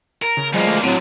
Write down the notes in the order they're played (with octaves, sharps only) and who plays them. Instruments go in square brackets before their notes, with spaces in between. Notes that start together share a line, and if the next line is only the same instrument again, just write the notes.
[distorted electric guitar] A#4
[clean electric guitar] C#3
[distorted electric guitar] C#2 A#3 [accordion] F3 G#3 [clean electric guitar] F#3 D5
[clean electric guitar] A3 D5
[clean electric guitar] A2 C4 [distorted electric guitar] D3 F3 [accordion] F#3